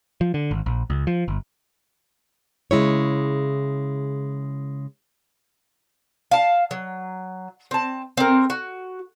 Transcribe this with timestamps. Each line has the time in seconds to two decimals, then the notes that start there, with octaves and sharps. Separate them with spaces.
0.21 F3
0.34 D3
0.51 G#1
0.66 A#1
0.90 C#2
1.07 F3
1.28 G1
2.71 C#3 G#3 E4 C#5
6.31 F5 A5
6.71 F#3
7.71 C4 A5
8.17 C4 A#4
8.50 F#4